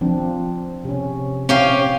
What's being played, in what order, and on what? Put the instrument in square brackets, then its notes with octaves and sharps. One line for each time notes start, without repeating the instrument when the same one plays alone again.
[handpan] F3 C4 D4
C3 C#4
[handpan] C4 [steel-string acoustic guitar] C#4 G4 F5